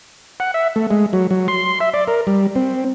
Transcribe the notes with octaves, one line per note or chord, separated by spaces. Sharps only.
F#5
E5
A3
G#3
F#3
F#3
C6
E5
D5
A#4
G3
C4